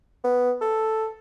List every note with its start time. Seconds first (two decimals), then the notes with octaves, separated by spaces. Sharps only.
0.24 B3
0.61 A4